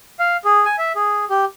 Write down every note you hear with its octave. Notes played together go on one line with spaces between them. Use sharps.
F5
G#4
G#5
E5
G#4
G4